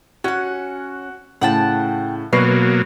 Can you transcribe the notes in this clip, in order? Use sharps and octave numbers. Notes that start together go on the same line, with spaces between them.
C#4 F#4 F#5
A2 C#3 F#5 G5 A5
B2 F#3 A#3 B4 F5 C#6 C7